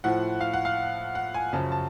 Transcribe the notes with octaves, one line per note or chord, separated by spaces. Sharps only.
A2 F3 F#5
F5
F#5
F5
F#5
G#5
F#2 C#3 F3 A5
A5